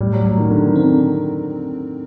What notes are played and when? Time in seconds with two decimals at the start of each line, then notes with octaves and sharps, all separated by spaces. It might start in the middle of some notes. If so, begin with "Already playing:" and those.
0.01 A2 G3
0.13 F#3
0.25 A2 F#3
0.37 D#3
0.50 A2 D3
0.67 D#3
0.76 C4
0.83 D3